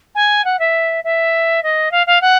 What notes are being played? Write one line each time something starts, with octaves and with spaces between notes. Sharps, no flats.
G#5
F#5
E5
E5
D#5
F5
F5
F#5